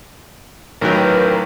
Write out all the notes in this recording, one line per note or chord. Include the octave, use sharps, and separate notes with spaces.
A1 D#3 F#3 A#4 B4 G5